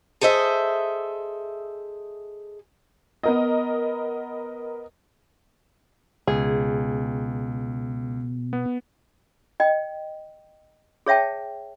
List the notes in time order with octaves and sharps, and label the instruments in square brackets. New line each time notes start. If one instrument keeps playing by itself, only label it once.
[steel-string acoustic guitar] G#4 A4 C5 D#5 E5
[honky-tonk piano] B3 A#4 D#5
[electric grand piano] C#2 [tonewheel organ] B2 [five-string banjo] G#4
[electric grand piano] B3
[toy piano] D#5 G5
G#4 C#5 E5 G5 A5